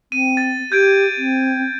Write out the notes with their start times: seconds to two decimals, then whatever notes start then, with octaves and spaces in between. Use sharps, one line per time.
0.12 C4 D#7
0.37 A6
0.72 G4 G6 G#6 D7
1.18 C4